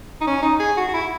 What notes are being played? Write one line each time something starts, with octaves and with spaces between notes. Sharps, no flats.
D#4
C#4
D#4
G#4
F#4
F#4
E4